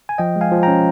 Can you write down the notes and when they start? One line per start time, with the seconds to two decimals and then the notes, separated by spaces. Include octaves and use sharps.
0.09 G#5
0.18 F3 D#5 G5
0.36 G#3
0.41 F5 G#5
0.52 F3
0.63 C#4 G5 A#5